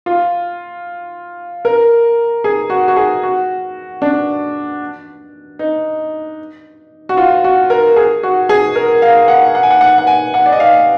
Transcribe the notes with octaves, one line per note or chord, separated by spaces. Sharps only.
F4
A#4
G#4
F#4
F#4
G#4
F#4
D4
D#4
F#4
F4
F#4
A#4
G#4
F#4
G#4
A#4
F5
F#5
F#5
G#5
F#5
F#5
F#5
G#5
F#5
D5
D#5
F5